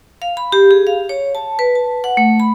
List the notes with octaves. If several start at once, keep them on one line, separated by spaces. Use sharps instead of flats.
F5
B5
G4
G#4
F5
C#5
A5
B4
A5
F#5
A3
B5